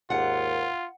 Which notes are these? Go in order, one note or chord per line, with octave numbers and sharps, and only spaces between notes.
D#2 G#2 F4 F#5